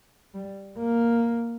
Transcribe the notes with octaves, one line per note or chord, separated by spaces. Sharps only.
G3
A#3